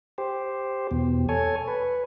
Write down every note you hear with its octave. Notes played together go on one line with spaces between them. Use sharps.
G4 C5
E2 B2
A4 C#5 G#5
B4